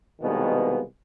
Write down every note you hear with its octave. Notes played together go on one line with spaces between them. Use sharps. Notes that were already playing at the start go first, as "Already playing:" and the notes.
C2 B2 D#3 G#3 A#3 B3